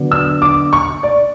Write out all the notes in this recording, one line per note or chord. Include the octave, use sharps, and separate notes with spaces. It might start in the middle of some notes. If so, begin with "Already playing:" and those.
Already playing: D3 F#3 B3 D4
E6
D6
C#6
D5